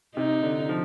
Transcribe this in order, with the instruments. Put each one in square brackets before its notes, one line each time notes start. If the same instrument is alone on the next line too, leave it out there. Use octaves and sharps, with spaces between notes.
[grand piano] C3 [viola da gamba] D#4
[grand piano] D3
F3